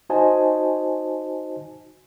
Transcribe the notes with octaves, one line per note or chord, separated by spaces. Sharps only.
D#4 F#4 C5 D#5 G#5 A5